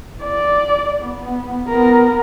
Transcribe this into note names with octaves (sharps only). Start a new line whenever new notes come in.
D5
B3
B3 A#4